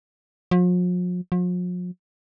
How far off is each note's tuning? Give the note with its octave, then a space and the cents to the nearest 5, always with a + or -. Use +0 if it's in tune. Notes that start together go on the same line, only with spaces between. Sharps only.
F3 +45
F3 +45